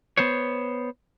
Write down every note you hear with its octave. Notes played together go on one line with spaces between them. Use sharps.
B3 C5 C#5